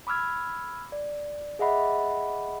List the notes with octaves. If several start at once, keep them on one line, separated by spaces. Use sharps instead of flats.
B5 D6 E6 F6 G#6
D5
G#4 D#5 E5 F#5 B5